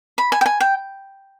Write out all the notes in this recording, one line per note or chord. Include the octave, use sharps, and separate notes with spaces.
B5
G#5
G5
G#5
G5